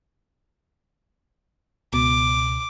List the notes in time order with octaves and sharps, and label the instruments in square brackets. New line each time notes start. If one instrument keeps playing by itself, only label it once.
[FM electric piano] C#2 B2 [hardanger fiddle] D6